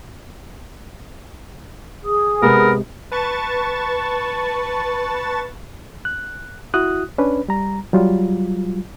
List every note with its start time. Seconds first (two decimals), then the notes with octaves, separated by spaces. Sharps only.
2.04 G#4 D#6
2.42 C3 G#3 B3 A#4
3.12 B4 A5 C#6 A6
6.05 F#6
6.74 E4 F#4 D#6 F#6
7.18 C#4 D4 B4
7.48 G3 A#5
7.93 F#3 G3 F4